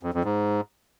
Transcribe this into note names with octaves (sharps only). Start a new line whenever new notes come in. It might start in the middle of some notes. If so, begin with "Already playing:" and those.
F2
F2
G#2